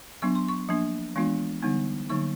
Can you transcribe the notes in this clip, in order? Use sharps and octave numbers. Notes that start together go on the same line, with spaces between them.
F#3 B3 D4 C#6
C6
C#6
F3 A#3 D4
E3 G#3 B3 D4 F4
D3 G3 B3 D#4
D3 F#3 A#3 D#4 C#6